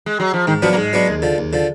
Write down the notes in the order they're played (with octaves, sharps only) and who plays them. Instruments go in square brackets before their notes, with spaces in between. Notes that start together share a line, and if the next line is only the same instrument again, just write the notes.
[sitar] G#3
F#3
F3
[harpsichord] G#2 [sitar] D#3
[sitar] F3 [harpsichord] F#3 B3 D4 F#4
[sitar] A#3
[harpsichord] G#2 [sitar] G#3
[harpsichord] F#3 B3 D4 F#4
D#2
D3 F3
D#2
D3 F3